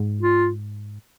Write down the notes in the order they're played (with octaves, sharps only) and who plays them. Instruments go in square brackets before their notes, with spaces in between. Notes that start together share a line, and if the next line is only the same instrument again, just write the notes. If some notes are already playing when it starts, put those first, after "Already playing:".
Already playing: [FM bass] G#2
[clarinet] F4